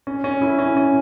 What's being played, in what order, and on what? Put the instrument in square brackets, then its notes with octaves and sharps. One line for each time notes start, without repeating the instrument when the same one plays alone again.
[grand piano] C#4
C#4
E4
C#4
C#4